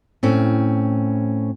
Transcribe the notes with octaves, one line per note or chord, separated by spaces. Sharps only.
A2 C4 C#4